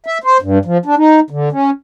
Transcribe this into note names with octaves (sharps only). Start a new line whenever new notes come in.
E5
C5
G2
F3
D4
D#4
D3
C#4